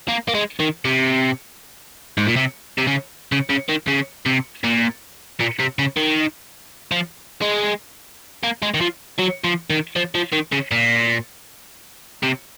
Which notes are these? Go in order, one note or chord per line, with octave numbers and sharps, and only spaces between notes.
A#3
A#3
G#3
D#3
C3
G#2
A#2
C3
C3
C#3
C#3
C#3
D#3
C#3
C3
A#2
A#2
C3
C#3
D#3
F3
G#3
A#3
G#3
D#3
F3
F#3
F3
D#3
F3
F3
D#3
C#3
A#2
C3